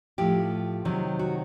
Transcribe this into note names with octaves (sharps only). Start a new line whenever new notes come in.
A2 F3 G4
C3 D#3 F#3
F#4